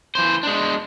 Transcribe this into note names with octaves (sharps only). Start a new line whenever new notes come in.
E3 C5
G#3 D4